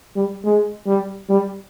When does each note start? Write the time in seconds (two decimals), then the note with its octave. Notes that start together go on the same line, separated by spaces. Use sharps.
0.16 G3
0.44 G#3
0.86 G3
1.30 G3